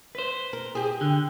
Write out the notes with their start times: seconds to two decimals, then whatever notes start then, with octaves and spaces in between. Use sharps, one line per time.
0.15 B4 C5
0.53 A#4
0.75 G4 G#4
1.01 D3